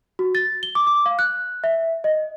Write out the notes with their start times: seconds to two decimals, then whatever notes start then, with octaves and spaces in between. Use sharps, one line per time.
0.19 F#4
0.35 A6
0.63 G7
0.75 D6
0.87 D6
1.06 F5
1.19 F#6
1.64 E5
2.04 D#5